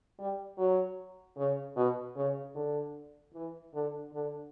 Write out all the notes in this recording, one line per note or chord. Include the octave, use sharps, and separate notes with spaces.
G3
F#3
C#3
B2
C#3
D3
E3
D3
D3